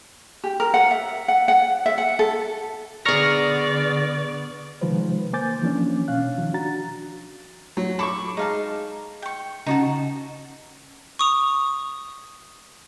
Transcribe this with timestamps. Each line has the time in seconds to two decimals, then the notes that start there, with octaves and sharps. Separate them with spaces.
0.44 G4
0.60 A#4
0.74 F#5
0.91 E5
1.28 F#5
1.48 F#5
1.86 E5
1.98 F#5
2.19 A4
3.05 D3 B3 G#4 D5 A#5 C#6 F6 A#6
4.81 C3 D#3 F3 G#3 B4 C5
5.33 A#3 C5 G#5 D6 G6 A6
5.62 E3 F3 A#3 C#4 D4
6.08 B2 C#4 F5 F#6
6.38 D#3 F3
6.54 D4 F#4 A#5 A6
7.77 F#3
7.99 A4 B5 C#6 D6
8.37 G#3 D#4 F5 A5
9.22 G5 C#6
9.66 C#3 C#4 D#4 F#4 A5
11.19 C#6 D#6 F7